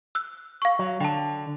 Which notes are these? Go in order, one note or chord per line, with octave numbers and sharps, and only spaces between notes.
E6 F#6
F5 C#6
F#3
D3 G5 A5